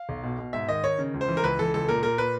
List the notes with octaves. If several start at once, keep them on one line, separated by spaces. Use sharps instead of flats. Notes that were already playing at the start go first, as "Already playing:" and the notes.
Already playing: F5
B1
B2
B2
G#2 E5
D#3 D#5
D#3 C#5
C#3
C#2
C5
E3
A#4
C#2 B4
E3 A4
C#2 A4
A#2 A#4
A#2 A#4
A#2 B4